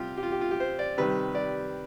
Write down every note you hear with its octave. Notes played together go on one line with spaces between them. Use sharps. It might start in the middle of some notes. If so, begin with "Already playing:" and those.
Already playing: C3 G3 F4 G4
G4
F4
G4
F4
G4
C5
D5
C3 D#3 G3 B4
D5